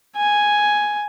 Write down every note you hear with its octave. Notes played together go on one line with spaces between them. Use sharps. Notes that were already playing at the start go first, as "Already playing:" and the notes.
G#5